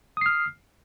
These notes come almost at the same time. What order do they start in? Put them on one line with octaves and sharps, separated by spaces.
D#6 C7 F6